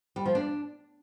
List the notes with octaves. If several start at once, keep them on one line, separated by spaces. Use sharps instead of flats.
G3
F3
D4